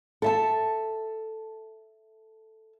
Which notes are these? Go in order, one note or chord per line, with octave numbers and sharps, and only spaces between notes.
A4 E5 A5